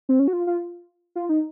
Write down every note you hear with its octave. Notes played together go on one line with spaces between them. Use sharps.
C4
C#4
F#4
F4
F4
F4
D#4